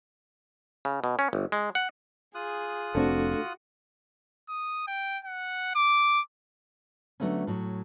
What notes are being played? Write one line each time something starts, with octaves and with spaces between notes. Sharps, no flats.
C#3
B2
C#4
G1
G#3
F#5
F4 G#4 D#6 F#6
F1 A3 C4 D4 F#4 A4
D#6
G5
F#5
D6
D3 F#3 A3 B3 C#4
A2 F#3